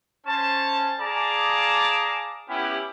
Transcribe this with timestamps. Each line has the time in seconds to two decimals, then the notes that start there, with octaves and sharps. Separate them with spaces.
0.26 C#4 C5 A5
1.00 G#4 D5 F5 A5 A#5 D6
2.49 B3 C#4 E4 G4